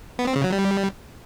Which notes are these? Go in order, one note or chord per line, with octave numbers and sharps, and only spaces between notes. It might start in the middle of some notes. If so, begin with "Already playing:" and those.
B3
C4
C#3
F#3
G3